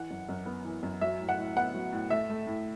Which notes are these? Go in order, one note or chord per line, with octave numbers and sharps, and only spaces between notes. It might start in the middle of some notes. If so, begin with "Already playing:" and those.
Already playing: E3 F#5
F#2
F#2
B3
E3
F#2
F#3 E5
A2
F#5
A2
B3 F#5
F#3
A2
A3 E5
A3
A2